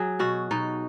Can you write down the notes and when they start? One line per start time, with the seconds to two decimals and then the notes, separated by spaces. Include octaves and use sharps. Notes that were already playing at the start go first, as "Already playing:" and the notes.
Already playing: F#3 G#4
0.19 B2 F#4
0.51 B2 D#4